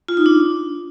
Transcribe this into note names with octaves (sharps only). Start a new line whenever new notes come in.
F4
D#4
D4